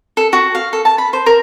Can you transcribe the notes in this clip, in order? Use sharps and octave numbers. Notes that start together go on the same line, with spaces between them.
A4
F#4
F5
A4
A5
B5
C5
A#4